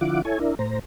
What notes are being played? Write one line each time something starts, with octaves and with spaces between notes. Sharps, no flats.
D3 F3 E4 F4 F#5 D6
E4 A4 C#5 G#5
D4 E4 A#4
A2 C5 A#5